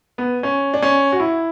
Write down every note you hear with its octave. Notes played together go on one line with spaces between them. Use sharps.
B3
C#4
D4
C#4
F#4
E4